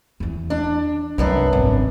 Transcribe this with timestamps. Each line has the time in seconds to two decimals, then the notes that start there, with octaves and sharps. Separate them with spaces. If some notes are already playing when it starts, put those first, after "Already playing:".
0.20 E2 E3
0.50 D4
1.18 C2 F#2 F#3 B3 D4
1.53 G#1